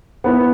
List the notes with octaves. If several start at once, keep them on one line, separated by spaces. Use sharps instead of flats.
B3 E4 B4